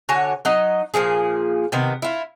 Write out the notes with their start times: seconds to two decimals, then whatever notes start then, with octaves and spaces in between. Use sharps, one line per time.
0.09 D3 F#4 C#5 G#5
0.45 F#3 D#4 D#5
0.94 A#2 D3 F3 G#4
1.72 C3 D#3 B3
2.02 E4 F4